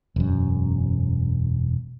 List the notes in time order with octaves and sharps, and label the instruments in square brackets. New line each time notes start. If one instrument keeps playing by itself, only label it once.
[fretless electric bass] E1 F#2